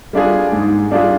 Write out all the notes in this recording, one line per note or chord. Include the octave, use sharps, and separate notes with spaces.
G3 D4 F4 G#4
G#2
G3 D4 F4 G#4